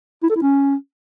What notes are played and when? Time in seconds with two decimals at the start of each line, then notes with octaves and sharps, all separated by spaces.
0.23 E4
0.29 A4
0.36 E4
0.42 C#4